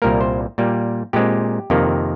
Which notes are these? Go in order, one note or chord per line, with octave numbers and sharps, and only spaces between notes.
C2 A#2 G3 A#3 A#4
C5
A#2 G3 A#3
A#2 G#3 C4 G4
F2 C3 D#3 A#3